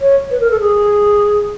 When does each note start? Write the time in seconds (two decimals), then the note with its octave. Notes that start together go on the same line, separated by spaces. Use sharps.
0.01 C#5
0.31 B4
0.41 A#4
0.51 A4
0.60 G#4